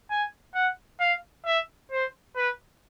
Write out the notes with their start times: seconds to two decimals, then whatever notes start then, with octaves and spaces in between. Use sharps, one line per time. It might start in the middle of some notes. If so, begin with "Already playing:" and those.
0.10 G#5
0.55 F#5
1.00 F5
1.45 E5
1.92 C5
2.36 B4